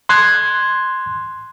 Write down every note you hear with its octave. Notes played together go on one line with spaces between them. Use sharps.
C6 F#6 G#6